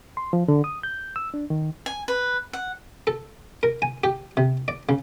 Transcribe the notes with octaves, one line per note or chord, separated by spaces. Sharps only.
C6
F3
D3
D#6
G6
E6
D4
D#3
G#5
B4
F#5
A4
A#4
G#5
G4
C3
D5
C#3